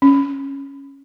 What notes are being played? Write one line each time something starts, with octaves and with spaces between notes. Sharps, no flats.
C#4